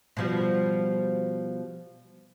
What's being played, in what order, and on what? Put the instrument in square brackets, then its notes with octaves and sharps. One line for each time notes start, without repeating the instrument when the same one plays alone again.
[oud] B2 F3 G3